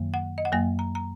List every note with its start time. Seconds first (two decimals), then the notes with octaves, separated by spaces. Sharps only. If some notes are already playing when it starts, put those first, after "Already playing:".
Already playing: F#2 D#3 F#3 A#3
0.14 F#5
0.38 D#5
0.45 F#5
0.52 F#2 F#3 A#3 G#5
0.79 A#5
0.95 A#5